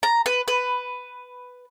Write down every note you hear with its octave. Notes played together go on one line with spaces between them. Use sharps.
A#5
B4
B4